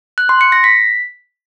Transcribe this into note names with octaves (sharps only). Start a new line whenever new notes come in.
F#6
C6
C#7
A#6
B6